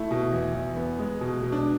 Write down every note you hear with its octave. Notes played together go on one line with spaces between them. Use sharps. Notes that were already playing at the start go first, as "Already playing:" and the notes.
Already playing: A3 E4
B2
E2
E2
B3
G#3
B2
B2
D4